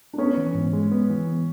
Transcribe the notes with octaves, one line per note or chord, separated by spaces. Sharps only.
D4
B3 C#4
E3
G#2
G#3
B3
E3